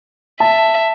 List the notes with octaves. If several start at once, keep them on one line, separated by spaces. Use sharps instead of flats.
E5 A5